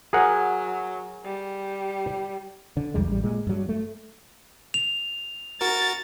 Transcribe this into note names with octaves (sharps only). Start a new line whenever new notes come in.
F#3 G#4 A#4 F#5
G3
D3
B1 E2 G3 G#3
A1 G3
A#2 G#3
G2 F#3
A3
F7
F#4 A#4 A6